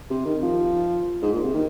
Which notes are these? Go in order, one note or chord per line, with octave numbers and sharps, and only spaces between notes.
C3
D#3
F3
G#2
A#2
C3
D#3